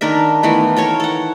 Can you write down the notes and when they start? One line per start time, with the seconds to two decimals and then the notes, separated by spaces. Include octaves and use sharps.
0.01 D#3 D4 A#4 E5
0.43 D#3 E3 A3 B3
0.76 A4 A#4 C#5
1.00 A4 F#5